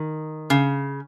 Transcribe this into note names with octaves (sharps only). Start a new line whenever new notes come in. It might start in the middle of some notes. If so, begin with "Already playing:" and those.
Already playing: D#3
C#3